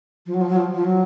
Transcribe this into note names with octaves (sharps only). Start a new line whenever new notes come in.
F3
F#3
F3
F#3
F3
F3
F#3